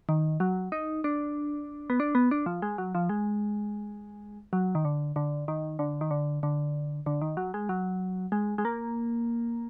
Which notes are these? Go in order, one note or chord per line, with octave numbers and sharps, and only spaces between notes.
D#3
F#3
D#4
D4
B3
D4
B3
D4
F3
G#3
F#3
F3
G#3
F#3
D#3
D3
D3
D#3
D3
D#3
D3
D3
D3
D#3
F#3
G#3
F#3
G#3
G#3
A#3